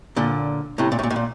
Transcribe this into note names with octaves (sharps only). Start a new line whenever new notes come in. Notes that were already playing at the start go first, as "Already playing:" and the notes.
A#2 D3
A2 C3
A#2
A2
A#2
A2
A#2